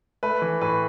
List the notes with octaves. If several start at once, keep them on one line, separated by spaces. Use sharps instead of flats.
A3 B4
E3
A2 B4